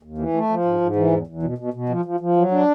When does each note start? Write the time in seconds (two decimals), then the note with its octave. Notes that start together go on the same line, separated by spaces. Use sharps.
0.03 D#2
0.18 E3
0.34 A3
0.49 F3
0.65 G#2
0.81 G#2
0.96 E3
1.12 E2
1.27 E2
1.43 B2
1.58 B2
1.74 B2
1.89 F3
2.05 F3
2.20 F3
2.36 F#3
2.51 D4